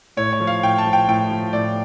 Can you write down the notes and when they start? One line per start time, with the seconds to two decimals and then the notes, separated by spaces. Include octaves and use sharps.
0.17 A2 C#5
0.33 C#5
0.40 F3
0.47 F5
0.63 A2 G5
0.78 A5
0.86 F3
0.93 G5
1.08 A2 G5
1.31 F3
1.53 A2 D5